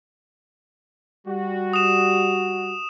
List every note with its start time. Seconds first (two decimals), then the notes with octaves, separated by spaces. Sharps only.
1.27 G3 F#4
1.73 D#6 E7